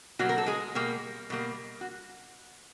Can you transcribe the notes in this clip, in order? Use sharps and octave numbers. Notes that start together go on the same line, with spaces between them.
B2 F#3 G3 A#3 F#4
A#4
A4
G#3 G#4
B2 G3 A#3
B2 G3 A#3
F#4